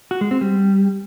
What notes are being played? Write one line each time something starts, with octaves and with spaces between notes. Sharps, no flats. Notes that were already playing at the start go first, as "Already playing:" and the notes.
F#4
G#3
C4
G3